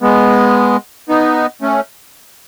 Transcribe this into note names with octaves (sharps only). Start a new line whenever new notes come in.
G#3 B3
B3 D#4
A3 C#4